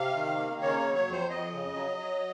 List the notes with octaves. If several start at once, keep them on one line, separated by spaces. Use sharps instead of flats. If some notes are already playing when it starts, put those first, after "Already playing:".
Already playing: C3 F5
D#3
A#3
C#3 C#5
C#5
F#3
C#5
F2
C5
F2 D#5
C#3
F#3
F#3